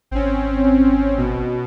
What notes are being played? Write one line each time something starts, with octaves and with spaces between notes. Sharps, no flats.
G#1 C4 C#4
B2